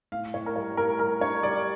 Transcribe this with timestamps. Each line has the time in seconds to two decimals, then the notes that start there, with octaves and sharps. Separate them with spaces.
0.12 A2 F5
0.34 A2 C#5
0.46 A#4
0.56 G3 C#5
0.77 A2 A#4
0.99 G3 A#4
1.21 D4 C#5
1.43 G3 D5